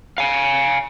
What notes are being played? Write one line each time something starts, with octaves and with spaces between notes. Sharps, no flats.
F5 G#5